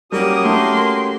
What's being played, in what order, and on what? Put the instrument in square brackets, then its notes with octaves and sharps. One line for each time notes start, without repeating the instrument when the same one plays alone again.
[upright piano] G3 [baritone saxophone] A#3 [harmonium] C#4 F#4 G4 [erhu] D#6
[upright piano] A3 [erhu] C6